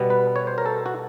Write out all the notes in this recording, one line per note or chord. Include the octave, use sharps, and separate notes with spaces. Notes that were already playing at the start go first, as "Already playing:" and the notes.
Already playing: B2 G3 B3
B4
C#5
C5
A#4
A4
F#4